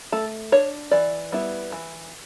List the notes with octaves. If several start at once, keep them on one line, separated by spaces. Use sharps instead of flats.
A3 A4
D4 C#5
E3 D5
G3 B3 E4
E3